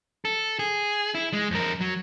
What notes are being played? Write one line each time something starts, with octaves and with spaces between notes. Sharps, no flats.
A4
G#4
E4
G#3
F2 A#4
F#3